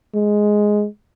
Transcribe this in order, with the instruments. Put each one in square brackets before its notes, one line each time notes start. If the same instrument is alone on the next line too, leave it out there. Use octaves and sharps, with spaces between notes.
[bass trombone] G#3